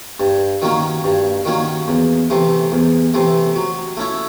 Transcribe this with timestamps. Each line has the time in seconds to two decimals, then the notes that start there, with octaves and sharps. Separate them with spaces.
0.20 G2
0.62 D#3 F#3 A#3 C#4
1.04 G2
1.45 D#3 F#3 A#3 C#4
1.88 E2
2.30 C3 E3 A3
2.72 E2
3.14 C3 E3 A3
3.56 F#3
3.97 A3 C#4 E4